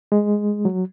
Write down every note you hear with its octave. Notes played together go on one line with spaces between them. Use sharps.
G#3
F#3